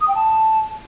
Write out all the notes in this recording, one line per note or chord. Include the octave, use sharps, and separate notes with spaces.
D#6
G5
A5